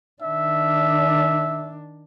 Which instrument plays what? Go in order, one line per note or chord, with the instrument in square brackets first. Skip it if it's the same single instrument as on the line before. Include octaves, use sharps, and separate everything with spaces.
[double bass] D#3 D4 [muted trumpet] E5